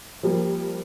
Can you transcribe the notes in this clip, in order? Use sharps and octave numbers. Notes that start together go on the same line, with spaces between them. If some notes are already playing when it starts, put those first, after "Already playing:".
F3 G3 A#3